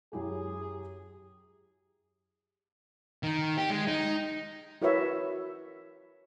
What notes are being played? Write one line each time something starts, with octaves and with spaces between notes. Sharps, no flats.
F#2 E4 G4 G#4
D#3
G4
G#3
D#4
E4 F#4 A#4 B4 C#5 E5